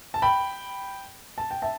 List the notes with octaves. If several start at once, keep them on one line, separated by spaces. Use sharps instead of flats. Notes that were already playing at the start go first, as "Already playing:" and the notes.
A5
G5 B5
A5
G5
E5 A5